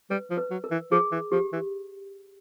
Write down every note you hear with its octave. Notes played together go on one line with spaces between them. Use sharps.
G3 B4
F3
B4
F#3
A#4
E3
F3 G#4
E3
F3 G4
E3